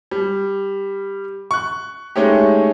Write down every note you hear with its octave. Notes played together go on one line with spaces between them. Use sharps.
G3
C#6 F#6
G#3 A3 C#4 D#4 G4